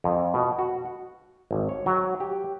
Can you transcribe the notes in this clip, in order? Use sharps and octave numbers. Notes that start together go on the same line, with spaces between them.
F2
B2
F#4
F#5
G#1
C#5
F#3
G4